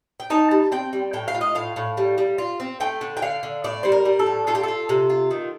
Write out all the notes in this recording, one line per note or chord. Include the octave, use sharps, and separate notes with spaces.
G5
D#4 A5
G3
C4 G5
G3
A2 G5
F5
F4
D#5
A2 F5
A2
G3
G3
F4
C4
A3 G5
D3
G5
D3 F5
D3
A2 D5
G3 C5
A#4
G3
A4
A2
F4 A4
G4
F4 A4
C3
F4
D#3